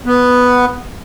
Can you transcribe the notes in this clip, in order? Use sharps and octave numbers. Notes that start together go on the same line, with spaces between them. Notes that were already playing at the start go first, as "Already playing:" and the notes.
B3